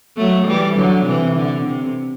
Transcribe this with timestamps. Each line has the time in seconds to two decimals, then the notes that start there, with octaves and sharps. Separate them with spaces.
0.17 F#3 A3
0.47 E3 G3
0.76 D3 F#3
1.06 C3 E3
1.36 D3
1.66 C3